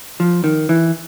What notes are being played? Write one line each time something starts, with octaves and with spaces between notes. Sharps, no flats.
F3
D#3
E3